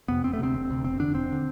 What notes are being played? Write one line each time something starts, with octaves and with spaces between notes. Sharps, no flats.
F2 C3 B3
E1 C4
A3
D2 C3 C4
E1
D2 C3
E1 C4
E2 D3 D4
E1 C4
D3